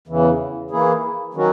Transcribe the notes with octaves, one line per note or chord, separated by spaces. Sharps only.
E2 C#3 E3
E3 A#3 E4 G#4
D#3 F#3 C#4 F#4